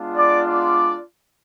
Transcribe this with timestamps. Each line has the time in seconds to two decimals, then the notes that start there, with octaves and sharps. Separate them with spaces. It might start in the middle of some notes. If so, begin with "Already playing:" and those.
Already playing: G#3 B3 D4 F4
0.16 D5 D6
0.44 D5 D6